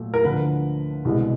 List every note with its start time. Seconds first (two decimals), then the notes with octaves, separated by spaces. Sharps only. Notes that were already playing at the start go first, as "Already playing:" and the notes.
Already playing: A#2 F#3 A3
0.14 A#4
0.24 D2 D3 F3 B4
1.05 C2 B2 G#3